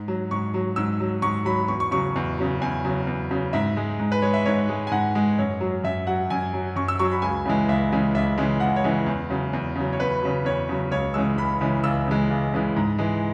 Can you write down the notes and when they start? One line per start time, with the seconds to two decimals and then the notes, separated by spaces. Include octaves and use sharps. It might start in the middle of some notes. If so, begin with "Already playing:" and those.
Already playing: G#2
0.08 F#3
0.31 G#2 C#6
0.54 F#3
0.76 G#2 E6
1.00 F#3
1.22 G#2 C#6
1.45 F#3 B5
1.68 E2 C#6
1.80 C#6
1.91 C#3 F#3 C#6
2.16 E2
2.38 C#3 F#3
2.61 E2 G#5
2.85 C#3 F#3
3.07 E2
3.30 C#3 F#3
3.53 G#2 E5
3.77 G#3
4.00 G#2
4.12 B4
4.22 G#3 C#5
4.34 E5
4.46 G#2 C#5
4.69 G#3
4.87 G#5
4.91 G#2 F#5
5.15 G#3
5.38 F#2 C#5
5.61 F#3
5.83 F#2 E5
6.07 F#3 F#5
6.30 F#2 G#5
6.53 F#3
6.76 F#2 C#6
6.88 E6
6.99 F#3 C#6
7.12 B5
7.22 C#2 G#5
7.46 C#3 E3 G#3
7.68 C#2 E5
7.92 C#3 E3 G#3
8.14 C#2 E5
8.38 C#3 E3 G#3
8.60 C#2 F#5
8.76 C#5
8.84 C#3 E3 G#3
9.06 E2
9.30 C#3 F#3
9.53 E2
9.76 C#3 F#3
9.93 C#5
10.00 E2 B4
10.22 C#3 F#3
10.45 E2 C#5
10.69 C#3 F#3
10.91 C#2 C#5
11.14 C#3 E3 G#3 E6
11.37 C#2 B5
11.61 C#3 E3 G#3
11.84 C#2 E6
12.07 C#3 E3 G#3
12.30 C#2
12.54 C#3 E3 G#3
12.76 G#2
12.98 E3 G#3